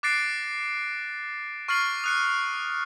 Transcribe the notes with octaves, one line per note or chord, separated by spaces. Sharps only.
D6 F#6 A6 A#6 C7 D7
C#6 F6 A6 C7 F#7
D#6 F#6 C#7